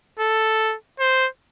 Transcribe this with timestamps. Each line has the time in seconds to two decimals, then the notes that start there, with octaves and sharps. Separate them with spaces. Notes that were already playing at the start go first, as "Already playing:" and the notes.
0.19 A4
1.00 C5